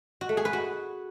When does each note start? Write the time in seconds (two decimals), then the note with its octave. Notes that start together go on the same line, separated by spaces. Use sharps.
0.21 F#4
0.29 A3
0.37 G#4
0.45 B4
0.53 F#4